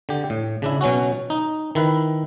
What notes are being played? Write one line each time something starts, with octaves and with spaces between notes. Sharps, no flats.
D3 G4
A2
C#3 D4 E4
B2 F#3 C#4 F#4
D#4
D#3 E4 B4